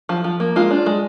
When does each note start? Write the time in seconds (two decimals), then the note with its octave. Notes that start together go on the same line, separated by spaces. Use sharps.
0.09 F3
0.24 F3
0.40 A#3
0.56 G#3 F4
0.71 D4
0.86 G#3